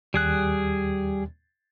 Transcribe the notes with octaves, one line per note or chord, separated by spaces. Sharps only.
D#2 G3 G#4 F#6